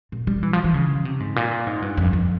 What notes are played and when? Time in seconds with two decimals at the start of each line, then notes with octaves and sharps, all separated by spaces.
0.12 A#2
0.27 G3
0.43 E3
0.53 F3
0.64 E3
0.74 C#3
1.05 C3
1.20 G#2
1.36 A#2
1.67 G#2
1.82 G2
1.97 F2
2.13 F2